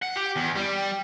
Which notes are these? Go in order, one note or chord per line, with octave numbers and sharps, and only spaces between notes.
F#5
G4
E2
G3